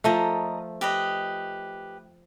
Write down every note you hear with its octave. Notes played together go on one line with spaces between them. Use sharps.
F3 A3 A#4 D#5 A#5
G4 B4 D#5